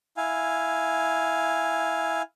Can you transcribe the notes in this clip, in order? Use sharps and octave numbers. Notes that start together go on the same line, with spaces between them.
E4 F5 G#5